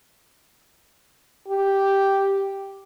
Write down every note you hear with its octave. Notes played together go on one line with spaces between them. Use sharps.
G4